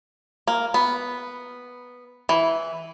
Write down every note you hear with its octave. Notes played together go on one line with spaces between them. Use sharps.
A#3
B3
E3